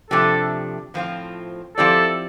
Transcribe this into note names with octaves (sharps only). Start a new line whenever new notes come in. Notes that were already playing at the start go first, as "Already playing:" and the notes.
C3 F3 A3 D4 G4 A4
A2 F3 C4 F4
F3 C4 E4 G4 A4 D5